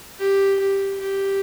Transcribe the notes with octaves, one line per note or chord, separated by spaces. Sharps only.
G4
G4
G4